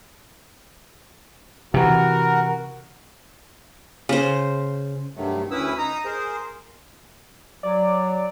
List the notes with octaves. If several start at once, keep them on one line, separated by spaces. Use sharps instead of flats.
C3 E3 F#4 A#4
C#3 C5
G2 C3 D#3 F#3 A3
D2 C#4 E4 B4 D#6 E6
D#4 A#5 D#6
G#4 A#4 C5
F#3 D5